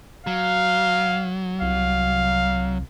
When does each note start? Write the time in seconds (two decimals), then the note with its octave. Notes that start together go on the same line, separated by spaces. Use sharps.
0.27 F#3 F5
1.62 C2 F5